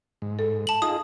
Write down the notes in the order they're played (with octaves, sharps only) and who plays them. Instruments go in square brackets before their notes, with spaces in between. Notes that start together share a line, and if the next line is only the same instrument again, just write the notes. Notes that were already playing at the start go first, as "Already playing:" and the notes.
[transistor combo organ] G#2
[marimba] A4
[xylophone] A5 F#7
[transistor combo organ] D#4 F4 G#4 [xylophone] D#6